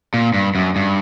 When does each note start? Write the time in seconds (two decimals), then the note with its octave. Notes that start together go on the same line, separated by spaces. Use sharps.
0.14 A#2
0.34 G2
0.55 F#2
0.76 G2